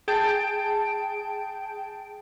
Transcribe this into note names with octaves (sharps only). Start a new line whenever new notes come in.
G#4 G5 A5 D7